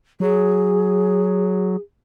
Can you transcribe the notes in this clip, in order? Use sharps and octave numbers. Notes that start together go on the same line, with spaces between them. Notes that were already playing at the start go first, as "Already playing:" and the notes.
F#3 G#4